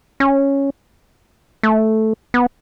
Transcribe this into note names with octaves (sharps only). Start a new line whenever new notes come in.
C#4
A3
B3